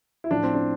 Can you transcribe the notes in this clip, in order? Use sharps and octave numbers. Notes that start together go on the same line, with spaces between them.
E4
A2 F3 D4
C4
D4